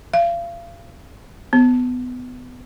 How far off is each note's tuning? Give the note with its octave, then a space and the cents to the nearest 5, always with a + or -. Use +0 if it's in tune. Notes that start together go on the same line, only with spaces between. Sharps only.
F5 -35
B3 +20